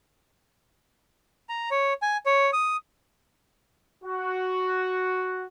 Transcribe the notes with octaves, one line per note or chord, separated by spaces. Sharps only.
A#5
C#5
G#5
C#5
D#6
F#4